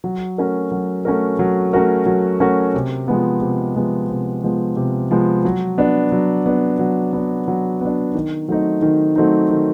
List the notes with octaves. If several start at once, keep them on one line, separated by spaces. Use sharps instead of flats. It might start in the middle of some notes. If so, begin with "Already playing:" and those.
F#3
A3 C#4 F#4 A#4
F#3
A3 C#4 F#4 A#4
F#3
A3 C#4 F#4 A#4
F#3
A3 C#4 F#4 A#4
C3
F3 G#3 B3
C3
F3 G#3 B3
C3
F3 G#3 B3
C3
F3 G#3 B3
F#3
B3 D4
F#3
B3 D4
F#3
B3 D4
F#3
B3 D4
D#3
F#3 A3 C4 D#4
D#3
F#3 A3 C4 D#4
D#3